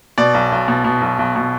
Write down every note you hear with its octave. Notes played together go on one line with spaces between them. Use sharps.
B2 D5
B1
B1
B2
B2
B1
B1
B2